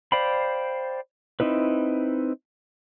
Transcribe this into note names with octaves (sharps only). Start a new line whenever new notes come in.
C5 D5 F5 G5 B5
C4 D#4 E4 B4